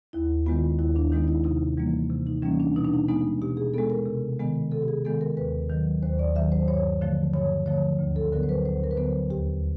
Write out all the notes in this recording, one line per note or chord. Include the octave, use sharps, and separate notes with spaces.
D#2 E4
D#3 G#3 B3 F4
D#2 E4
D4
D#3 G#3 B3 D#4
E4
C3 D#4
E3 G3 A#3
C3
D#4
E3 G3 A#3 C#4
D4
B2 D#4
D4
D#4
G#3 B3 D#4
B2 G4
G#4
G#3 B3 A4
A#4
C3
D#3 G#3 B3
C3 A4
G4
G#4
D#3 G#3 B3 A4
A#4
D#2 B4
D#3 F#3
D#2 C5
D5
D#3 F#3 E5
C5
G2 C#5
D3 F3 A3
G2 C#5
D3 F3 A3 C#5
D2
A4
D3 F#3 B3 A#4
C5
B4
D2 C5
A#4
B4
D3 F#3 B3 C5
D#2 G4